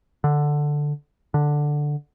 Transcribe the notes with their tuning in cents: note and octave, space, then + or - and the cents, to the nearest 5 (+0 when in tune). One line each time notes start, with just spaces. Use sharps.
D3 +5
D3 +5